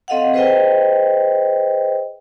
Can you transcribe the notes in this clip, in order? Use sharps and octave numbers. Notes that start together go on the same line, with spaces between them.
C4 A4 D#5 F5 F#5
G#4 B4 C5 D#5 E5 G5